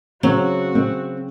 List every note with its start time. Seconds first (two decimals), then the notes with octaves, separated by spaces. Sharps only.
0.23 C#3 F#3 C4 F#4
0.75 C4